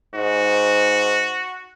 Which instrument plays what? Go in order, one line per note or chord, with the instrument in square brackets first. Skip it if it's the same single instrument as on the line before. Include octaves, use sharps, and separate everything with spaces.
[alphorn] G#2 [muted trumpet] F#4